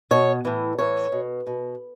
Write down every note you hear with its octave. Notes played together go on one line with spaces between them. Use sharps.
B2 C#5
A2 E3
A2 E3 C#5
B2
B2